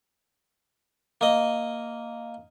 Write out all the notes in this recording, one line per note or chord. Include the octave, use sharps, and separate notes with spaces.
A#3 D#5